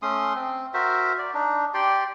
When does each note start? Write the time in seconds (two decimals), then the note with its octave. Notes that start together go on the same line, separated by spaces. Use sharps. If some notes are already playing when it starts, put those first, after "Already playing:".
0.02 A3 C#4 C6 D#6
0.35 C4
0.74 F#4 A#4 C5 E5
1.18 D5
1.34 D4 D#4
1.74 G4 D5 G5 C6